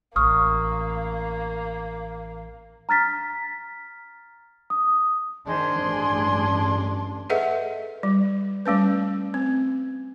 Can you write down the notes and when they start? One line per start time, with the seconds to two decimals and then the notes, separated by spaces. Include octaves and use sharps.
0.16 A1 A#3 C#6 D#6 F6
2.89 A#5 F6 A6 B6
4.70 D#6
5.47 D#3 D4 G#4 C5 C6
5.79 A1 G2
7.30 G#4 A4 B4 D#5 E5 F#5
8.03 G3
8.66 G3 A3 C#4 B4
9.34 C4